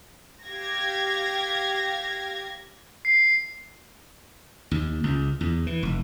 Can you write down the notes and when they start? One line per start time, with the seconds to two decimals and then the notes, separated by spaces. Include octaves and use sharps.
0.44 G4 F5 G#6 A#6
3.05 C7
4.71 D#2
5.04 C#2
5.41 E2
5.67 E3
5.83 F1